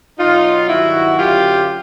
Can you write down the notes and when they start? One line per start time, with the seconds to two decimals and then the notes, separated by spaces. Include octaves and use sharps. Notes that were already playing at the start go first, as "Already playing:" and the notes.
0.19 B2 F#3 D#4 F4
0.68 G2 D#3 F#3 E4 F#4
1.17 F#2 D3 F#3 F4 G4